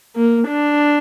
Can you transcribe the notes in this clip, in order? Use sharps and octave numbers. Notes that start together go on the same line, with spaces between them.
A#3
D4